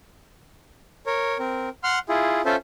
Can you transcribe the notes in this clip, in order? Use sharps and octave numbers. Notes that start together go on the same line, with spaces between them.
A#4 C#5
C4 A#4
F#5 C6 F6
E4 F4 G#4
C#4 F4 A4 C5 E5